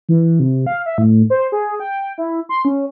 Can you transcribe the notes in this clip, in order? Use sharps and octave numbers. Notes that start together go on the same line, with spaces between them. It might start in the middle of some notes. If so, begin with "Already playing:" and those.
E3
C3
F5
E5
A2
C5
G#4
G5
E4
C6
C#4